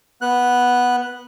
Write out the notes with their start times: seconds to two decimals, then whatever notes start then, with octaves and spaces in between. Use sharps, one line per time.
0.22 B3 F#6